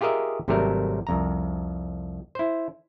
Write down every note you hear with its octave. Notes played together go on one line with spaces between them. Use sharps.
F4 G4 G#4 A#4 D#5 E5
G#1 C3 F#3 G3 A3 A#4
C2 F2 A#5
E4 C5